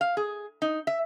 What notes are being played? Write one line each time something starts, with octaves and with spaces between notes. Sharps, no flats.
F5
G#4
D#4
E5